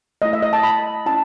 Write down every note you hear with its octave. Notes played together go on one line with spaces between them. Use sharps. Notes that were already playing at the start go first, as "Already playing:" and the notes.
A3 E4 D#5
E5
D#5
A5
B5
C#4 E4 A5